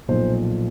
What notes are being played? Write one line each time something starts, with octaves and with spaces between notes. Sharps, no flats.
B1 A#2 F3 C5